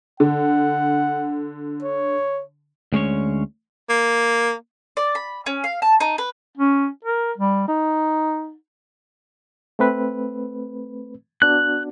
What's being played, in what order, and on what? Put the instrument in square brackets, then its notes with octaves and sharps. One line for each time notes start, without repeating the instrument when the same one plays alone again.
[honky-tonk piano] D3 [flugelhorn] F#5
[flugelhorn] C#5
[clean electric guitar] D2 G#3 C#4 C#5
[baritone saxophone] A#3
[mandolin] D5
B5
C#4
F5
A5
D#4
B4
[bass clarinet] C#4
A#4
G3
D#4
[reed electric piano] A3 C4 B4
[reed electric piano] B3 D4 F#4 [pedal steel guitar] F#6